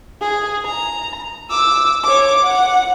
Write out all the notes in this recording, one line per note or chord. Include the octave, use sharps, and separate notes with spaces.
G#4
A#5
D6 E6
C#5 D6
F#5